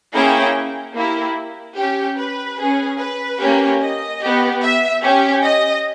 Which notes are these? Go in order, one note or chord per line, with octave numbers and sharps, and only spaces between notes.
A#3 C#4 E4 G#4 G5
A#3 E4 G4
C#4 G4
B4
C#4 G#4
B4
A#3 C#4 G4
D#5
B3 G4
E5
C#4 G4
D#5